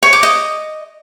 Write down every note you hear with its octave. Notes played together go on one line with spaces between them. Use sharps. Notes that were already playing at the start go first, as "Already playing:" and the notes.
C#5
D6
D#5